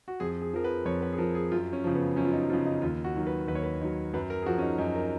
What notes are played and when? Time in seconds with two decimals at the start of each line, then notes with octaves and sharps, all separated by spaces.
0.08 F#4
0.20 F2 G#4
0.41 G#4
0.53 F3 A#4
0.64 B4
0.85 F2 C#5
1.02 B4
1.12 G#4
1.18 F3 A#4
1.35 G#4
1.52 F#2 F4
1.73 C#4
1.84 C#3 F3
1.94 B3
2.16 F#2 C#4
2.25 F4
2.33 D#4
2.50 C#3 F3 F4
2.66 D#4
2.82 D#2 F4
3.04 F#4
3.16 D#3 F#3
3.27 B4
3.48 D#2 B4
3.55 C#5
3.64 B4
3.81 D#3 F#3
4.14 F#2 B4
4.30 A#4
4.42 G#4
4.46 F3 F#4
4.58 C#4
4.62 D#4
4.78 F#2 D#4
4.95 A#4